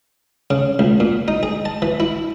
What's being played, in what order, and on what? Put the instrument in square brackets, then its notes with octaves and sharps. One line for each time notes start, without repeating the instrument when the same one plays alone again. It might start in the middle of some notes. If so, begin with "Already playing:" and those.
[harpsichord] C#3
C#2
A#2
D#4
G#4
A5
E3
E4